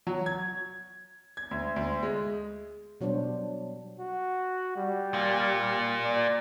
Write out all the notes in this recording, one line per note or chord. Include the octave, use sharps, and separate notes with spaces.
F#3
G#6
G#6
D2
D2
G#3
B2 F#3 G3 D4 C5
F#4
G3
A#2 A#3
D5